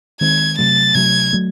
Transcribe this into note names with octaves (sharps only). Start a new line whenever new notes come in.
D#3 G#3 C4 G#6
C3 F#3 A3 A6
C3 F#3 A3 G#6
F#3 A3